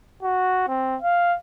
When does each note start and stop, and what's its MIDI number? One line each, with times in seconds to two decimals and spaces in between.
0.22 0.67 66
0.68 0.96 60
1.02 1.36 77